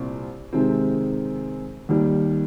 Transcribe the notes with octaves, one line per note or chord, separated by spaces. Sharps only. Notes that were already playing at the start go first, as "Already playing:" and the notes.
Already playing: C2 A#2 C4
C3 D#3 G#3 C4
D#2 D#3 G3